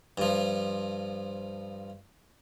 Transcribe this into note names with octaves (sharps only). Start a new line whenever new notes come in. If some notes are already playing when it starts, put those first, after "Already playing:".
G2 F3